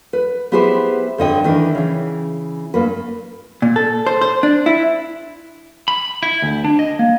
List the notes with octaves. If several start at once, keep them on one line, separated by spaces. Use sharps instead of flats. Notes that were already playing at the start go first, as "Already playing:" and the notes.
B4
B3 E4 G4 G#4 B4 C5
G2 D3 D#5 G5
D#3 E3 D4
C#3 E3
G2 A#3 B4
A#2
A4
C5
C5
D4
E4
B5
E4
D2
D4
D#5
A#3